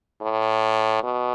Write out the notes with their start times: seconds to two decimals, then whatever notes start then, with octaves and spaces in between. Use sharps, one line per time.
0.22 A2
1.04 B2